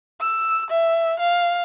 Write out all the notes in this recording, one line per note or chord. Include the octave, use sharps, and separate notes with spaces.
E6
E5
F5